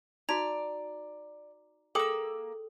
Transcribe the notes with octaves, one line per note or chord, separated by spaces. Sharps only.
D#4 F#4 D5 A#5
A#3 G#4 A4 G5 D#6 E6